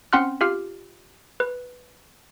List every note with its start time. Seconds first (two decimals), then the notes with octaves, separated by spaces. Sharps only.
0.13 C4 C#4 F#5 C6 F6 F#6
0.41 F4 G4 F5 F6
1.40 B4